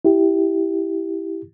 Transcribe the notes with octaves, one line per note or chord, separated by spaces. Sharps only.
E4 G4